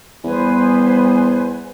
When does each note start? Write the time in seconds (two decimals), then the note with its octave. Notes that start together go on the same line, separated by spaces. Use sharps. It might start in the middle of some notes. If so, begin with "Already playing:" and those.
0.24 E2 G3 B3 B4 C5 G#5